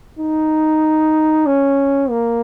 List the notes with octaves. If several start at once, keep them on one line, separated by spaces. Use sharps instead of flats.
D#4
C#4
A#3